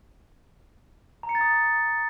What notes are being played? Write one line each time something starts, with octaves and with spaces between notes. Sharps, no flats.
A#5
C#7
A6
D#6